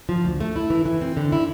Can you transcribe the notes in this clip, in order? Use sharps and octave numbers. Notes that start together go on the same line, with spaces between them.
F3
D2
A3
E4
E3
E3
C4
D3
E4